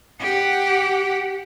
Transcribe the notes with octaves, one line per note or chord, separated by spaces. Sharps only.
G4 F#5